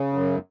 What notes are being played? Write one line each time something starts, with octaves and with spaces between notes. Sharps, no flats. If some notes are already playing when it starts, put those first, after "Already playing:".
Already playing: C#3
F#2